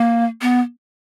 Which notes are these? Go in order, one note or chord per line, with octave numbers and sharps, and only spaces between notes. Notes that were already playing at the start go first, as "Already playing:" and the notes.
Already playing: A#3
B3